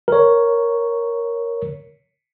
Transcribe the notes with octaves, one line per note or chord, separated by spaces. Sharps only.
A#4 C#5